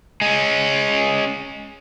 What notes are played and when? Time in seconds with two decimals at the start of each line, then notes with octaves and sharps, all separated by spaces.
0.22 G#3 C#4